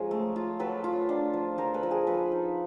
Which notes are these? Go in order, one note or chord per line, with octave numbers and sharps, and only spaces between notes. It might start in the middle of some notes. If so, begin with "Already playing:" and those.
Already playing: F3 G#3 C#4 G#4 A#4
A3
F4
F#3 A4 B4
F4
D4
F3
F3 A#4 C5
A4 B4
F3
G#4 A#4
F3 A4 B4
D#4